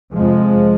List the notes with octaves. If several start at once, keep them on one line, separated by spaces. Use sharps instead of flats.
F2 C3 F3 G#3